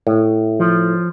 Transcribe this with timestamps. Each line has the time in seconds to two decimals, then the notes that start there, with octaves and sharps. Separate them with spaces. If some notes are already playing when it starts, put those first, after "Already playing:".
0.07 A2
0.60 F3